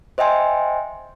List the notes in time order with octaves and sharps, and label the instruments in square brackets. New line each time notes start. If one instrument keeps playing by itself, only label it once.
[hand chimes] C5 D#5 E5 G5 G#5 C6